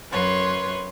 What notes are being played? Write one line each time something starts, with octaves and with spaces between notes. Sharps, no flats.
F#2 B4 C#5 C6